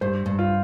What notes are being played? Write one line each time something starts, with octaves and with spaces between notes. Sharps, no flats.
G2 C5
G2
F4